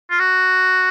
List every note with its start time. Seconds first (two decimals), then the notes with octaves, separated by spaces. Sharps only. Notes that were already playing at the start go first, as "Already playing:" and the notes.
0.10 F4
0.19 F#4